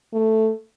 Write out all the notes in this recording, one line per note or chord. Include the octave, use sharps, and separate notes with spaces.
A3